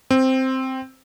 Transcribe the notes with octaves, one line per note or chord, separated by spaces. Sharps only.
C4